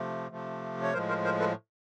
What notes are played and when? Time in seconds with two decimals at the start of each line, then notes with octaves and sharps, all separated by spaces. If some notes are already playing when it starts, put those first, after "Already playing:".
Already playing: C3 F3 A3
0.31 C3 F3 A3
0.82 C#5
0.93 A2 F3 G#3 A#4 C5
1.09 A#4 C5
1.25 A#4 C5
1.40 A4 B4